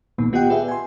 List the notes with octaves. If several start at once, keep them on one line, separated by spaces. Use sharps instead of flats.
C2 A#2 D#3 B3
B3 F4 G4 D#5 F#5 G5
G4 G#4 B4 D5 E5
G#5 C6